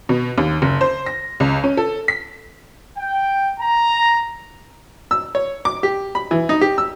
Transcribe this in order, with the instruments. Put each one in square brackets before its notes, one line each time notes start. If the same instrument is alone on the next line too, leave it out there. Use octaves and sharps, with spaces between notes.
[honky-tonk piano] B2
D#2
F#1
C5
A#6
C#2
C#4
A4
B6
[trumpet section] G5
A#5
[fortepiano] E6
C#5
D6
G4
B5
E3
D#4
G4
E6